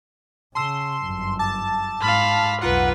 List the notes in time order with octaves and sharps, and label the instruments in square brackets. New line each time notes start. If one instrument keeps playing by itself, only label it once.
[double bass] C#3 [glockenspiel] A5 E6 E7 [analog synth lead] C6
[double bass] G1 F#2
[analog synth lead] A5 [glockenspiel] D6
[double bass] G#2 [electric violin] F5 B5 [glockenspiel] C6 F6 F#7
[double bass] B1 F2 [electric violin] F4 B4 [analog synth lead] F#5 [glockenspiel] A#5